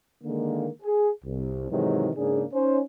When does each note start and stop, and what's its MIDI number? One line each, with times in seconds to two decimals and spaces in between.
0.24 0.68 50
0.24 0.68 51
0.24 0.68 56
0.24 0.68 58
0.83 1.09 68
1.24 1.68 36
1.69 2.09 44
1.69 2.09 48
1.69 2.09 51
1.69 2.09 52
1.69 2.09 54
1.69 2.09 56
2.16 2.43 44
2.16 2.43 49
2.16 2.43 58
2.16 2.43 62
2.16 2.43 68
2.53 2.79 61
2.53 2.79 63
2.53 2.79 72